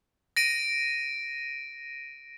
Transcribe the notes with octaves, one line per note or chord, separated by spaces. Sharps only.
A#6 D7 D#7